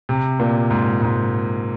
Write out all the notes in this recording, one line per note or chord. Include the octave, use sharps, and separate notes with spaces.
C3
A#2
G#2
G#2